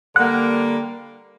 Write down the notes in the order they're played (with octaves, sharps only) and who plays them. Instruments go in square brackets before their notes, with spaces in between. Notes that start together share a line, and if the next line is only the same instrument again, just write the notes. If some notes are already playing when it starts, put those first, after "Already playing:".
[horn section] D3 G3 A#3 [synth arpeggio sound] F#5